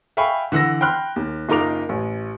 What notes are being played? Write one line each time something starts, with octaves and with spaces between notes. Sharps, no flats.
E5 F5 G5 G#5 B5 C#6
D3 E3 F#5 E6 A#6
G5 B5 C6 F6 F#6
D#2
F#1 D#4 F4 A#4 D6 F7
A1